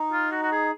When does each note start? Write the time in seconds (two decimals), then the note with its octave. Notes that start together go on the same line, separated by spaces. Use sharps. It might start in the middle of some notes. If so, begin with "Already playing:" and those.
Already playing: D#4
0.13 F4
0.32 F#4
0.43 F#4
0.52 G#4